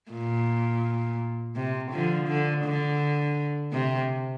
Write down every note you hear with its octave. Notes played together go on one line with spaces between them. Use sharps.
A#2
C3
D3 F3
D3
D3
C3